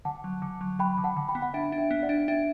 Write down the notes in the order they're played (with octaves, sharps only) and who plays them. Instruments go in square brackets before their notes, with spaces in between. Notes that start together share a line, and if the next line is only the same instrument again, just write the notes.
[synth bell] D3 [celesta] F#5 A5
[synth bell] F#3
D3
F#3
[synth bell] F#3 [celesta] G5 B5
[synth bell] D3
[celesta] F#5 A5
[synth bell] D3
[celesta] G5 B5
[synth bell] B3
[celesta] F#5
[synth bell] D4 [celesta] E5 G5
[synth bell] D4
[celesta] E5 G5
[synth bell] B3
[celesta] D5 F#5
[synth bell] D4
[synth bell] D4 [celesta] E5 G5